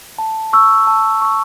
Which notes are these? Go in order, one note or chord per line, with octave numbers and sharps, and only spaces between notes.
A5
C#6 E6
A5
C#6 E6